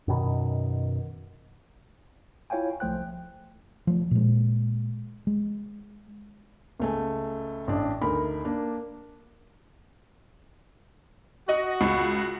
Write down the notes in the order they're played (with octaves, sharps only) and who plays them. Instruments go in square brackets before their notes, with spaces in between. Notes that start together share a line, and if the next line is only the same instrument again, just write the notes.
[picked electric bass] F#2 B2 D#3
[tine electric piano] E4 F4 C#5 F5 G5 G#5
C2 F3 A3 C5 G5 F#6
[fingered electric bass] F3 A3
A#2 G#3
G#3
[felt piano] C#2 A3 G#5
A1 D4
D2 D#4 A#4 B5
A#3 D4
[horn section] F#4 [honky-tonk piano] D#5
[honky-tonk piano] C#2